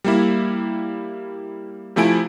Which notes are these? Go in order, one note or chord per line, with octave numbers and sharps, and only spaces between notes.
G3 A#3 E4
C3 F3 A3 E4 G#5 D7